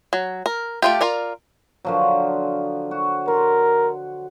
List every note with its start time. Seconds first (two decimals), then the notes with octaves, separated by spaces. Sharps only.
0.13 F#3
0.46 A#4
0.82 A3 F4 G4
1.01 F4 A#4 D5
1.85 D3 F3 F#3
2.91 F#4
3.28 A#4 C6